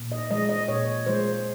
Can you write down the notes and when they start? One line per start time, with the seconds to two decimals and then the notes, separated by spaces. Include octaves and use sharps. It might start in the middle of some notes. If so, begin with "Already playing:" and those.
Already playing: A#2
0.12 D#5
0.30 F3 G#3 D#5
0.49 D#5
0.68 A#2 C#5
1.06 F3 G#3 C5